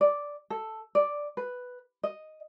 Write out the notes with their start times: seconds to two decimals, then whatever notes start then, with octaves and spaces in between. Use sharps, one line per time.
0.01 D5
0.50 A4
0.95 D5
1.37 B4
2.03 D#5